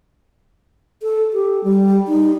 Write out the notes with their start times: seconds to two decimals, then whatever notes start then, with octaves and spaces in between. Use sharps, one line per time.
1.03 A4
1.33 G4
1.64 G3
2.08 D#4